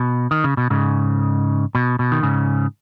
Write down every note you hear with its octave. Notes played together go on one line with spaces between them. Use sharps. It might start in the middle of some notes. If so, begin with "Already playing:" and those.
Already playing: B2
D#3
C#3
B2
G#2 C#3
B2
B2
D#3
G#2 C#3